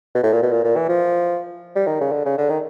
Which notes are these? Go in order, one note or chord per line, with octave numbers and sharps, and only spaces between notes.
B2
A2
A#2
B2
A#2
A#2
E3
F3
G3
D#3
C#3
D3
C#3
D3
D#3